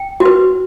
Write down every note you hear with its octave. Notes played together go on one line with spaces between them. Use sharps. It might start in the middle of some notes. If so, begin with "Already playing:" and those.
Already playing: G5
F#4
B4